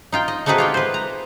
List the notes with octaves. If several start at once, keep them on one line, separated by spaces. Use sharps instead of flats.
D#4 F4 G5
D#5
A3 C4 D#4 F#4 G#4 B4
F4 G4 G5
B4 C5
A#5